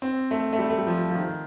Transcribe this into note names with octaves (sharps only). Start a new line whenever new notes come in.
C4
A3
A3
G3
A3
G3
F3
F3
D#3